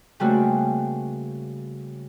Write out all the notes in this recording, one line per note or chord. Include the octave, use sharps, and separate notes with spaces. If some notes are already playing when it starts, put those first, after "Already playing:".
C#3 G3 A3 A#3 C4 F#4